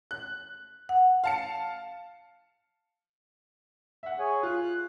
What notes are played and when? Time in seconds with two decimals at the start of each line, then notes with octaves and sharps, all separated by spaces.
0.11 F#6
0.89 F#5
1.24 F5 A5 C#7
4.03 E5 F#5
4.19 G#4 C#5 G#5
4.43 F4 F#6